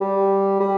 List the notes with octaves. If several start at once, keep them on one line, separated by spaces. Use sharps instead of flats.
G3
G3